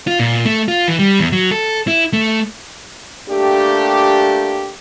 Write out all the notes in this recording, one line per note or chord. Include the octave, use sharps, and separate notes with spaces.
F4
A#2
A3
F4
E3
G3
E2
F#3
A4
E4
A3
A3 A#3 D4 G4